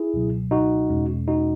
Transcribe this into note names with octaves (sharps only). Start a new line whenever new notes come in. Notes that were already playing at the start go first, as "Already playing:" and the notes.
Already playing: E4 G#4
C#2 B2 F#3
D#4 F#4
E2 B2 G#3 C#4
D#4 F#4